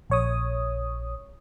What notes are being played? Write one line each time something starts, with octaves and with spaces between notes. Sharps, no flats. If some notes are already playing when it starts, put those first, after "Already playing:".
A#1 C#5 D#6